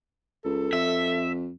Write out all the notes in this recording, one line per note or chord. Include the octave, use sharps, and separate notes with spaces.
C#2 A4
F2 E5